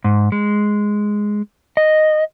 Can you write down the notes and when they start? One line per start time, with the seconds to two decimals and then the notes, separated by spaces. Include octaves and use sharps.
0.04 G#2
0.32 G#3
1.77 D#5